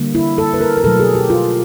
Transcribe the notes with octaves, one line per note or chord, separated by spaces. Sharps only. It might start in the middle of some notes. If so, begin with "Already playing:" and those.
Already playing: D3 G3 A#3
E4
A4
B4
A#4
A#4
B2 F#3 A3 A4
G#4
G4
F4